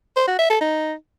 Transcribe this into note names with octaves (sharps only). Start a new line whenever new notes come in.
C5
F#4
E5
A4
D#4